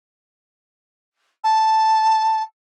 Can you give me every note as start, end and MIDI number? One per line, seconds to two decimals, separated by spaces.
1.44 2.42 81